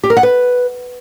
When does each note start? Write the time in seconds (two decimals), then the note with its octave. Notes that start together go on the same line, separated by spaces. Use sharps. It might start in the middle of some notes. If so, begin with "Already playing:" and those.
0.03 G4
0.10 A#4
0.17 F#5
0.23 B4